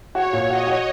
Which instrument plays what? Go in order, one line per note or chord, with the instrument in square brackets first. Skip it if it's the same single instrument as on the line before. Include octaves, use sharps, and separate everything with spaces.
[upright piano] F#4 [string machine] C#5
[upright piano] A#2
[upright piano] F#4 [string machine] D#5
[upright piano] F#4